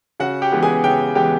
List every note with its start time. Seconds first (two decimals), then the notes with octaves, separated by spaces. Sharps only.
0.20 C#3 F#4 F#5
0.42 G4 G5
0.52 E3 G#3 B3
0.63 G#4 G#5
0.84 C#3 G4 G5
1.15 E3 G#3 B3 G4 G5